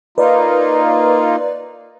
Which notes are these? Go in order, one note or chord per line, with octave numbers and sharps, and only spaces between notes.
A#3 D#4 F4 B4 D5